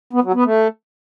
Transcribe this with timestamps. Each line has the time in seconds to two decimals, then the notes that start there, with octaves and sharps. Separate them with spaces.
0.13 B3
0.24 F#3
0.34 B3
0.45 A3